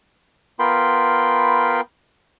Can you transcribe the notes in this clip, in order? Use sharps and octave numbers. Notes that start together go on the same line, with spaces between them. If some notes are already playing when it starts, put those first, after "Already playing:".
B3 F4 A#4 G5 B5 C6